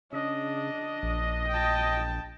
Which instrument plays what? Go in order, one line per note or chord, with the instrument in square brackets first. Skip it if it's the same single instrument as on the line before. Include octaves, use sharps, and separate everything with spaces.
[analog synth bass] C#3 [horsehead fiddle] D4 [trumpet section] D#5
[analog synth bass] A#1
[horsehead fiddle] G5 A5